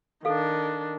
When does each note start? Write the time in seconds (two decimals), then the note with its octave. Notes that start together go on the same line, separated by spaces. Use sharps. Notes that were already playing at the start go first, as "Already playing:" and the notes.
0.25 D#3 D4 A4 F5